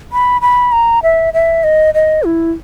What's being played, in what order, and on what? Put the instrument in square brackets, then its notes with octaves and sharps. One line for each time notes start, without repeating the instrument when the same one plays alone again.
[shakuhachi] B5
B5
A#5
E5
E5
D#5
D#5
E4